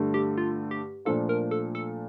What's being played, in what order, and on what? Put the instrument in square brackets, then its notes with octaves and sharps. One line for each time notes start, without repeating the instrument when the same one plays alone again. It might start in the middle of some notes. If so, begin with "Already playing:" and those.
Already playing: [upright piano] G2 D3 A3
[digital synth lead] G4
F4
G4
[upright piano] A#2 F3 A3 D4 F4 [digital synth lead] A4
[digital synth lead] A#4
A4
A4